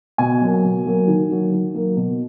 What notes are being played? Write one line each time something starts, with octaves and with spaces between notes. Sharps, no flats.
B2 G#5
F#3 A#3
B2
F#3 A#3
D#3
F#3 A#3
D#3
F#3 A#3
B2